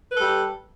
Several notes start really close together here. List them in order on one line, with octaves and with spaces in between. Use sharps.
B4 A4 G3